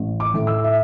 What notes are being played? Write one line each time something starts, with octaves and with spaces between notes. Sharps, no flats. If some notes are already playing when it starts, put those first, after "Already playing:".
Already playing: A1
D6
A2 A3
E6
E5